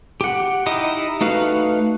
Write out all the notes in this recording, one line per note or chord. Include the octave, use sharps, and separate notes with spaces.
G4 F#5
D#4 E4 G4 D#5 D#6
A3 D#4 F#4 B4 F5